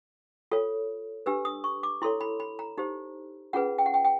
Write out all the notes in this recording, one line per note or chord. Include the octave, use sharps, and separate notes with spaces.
F4 A4 C#5
D4 G4 B4 E6
D#6
C#6
D6
E4 A4 C#5 C6
B5
B5
A#5
D#4 G4 C5
C#4 F4 G#4 B4 F#5
G5
F#5
G5
G5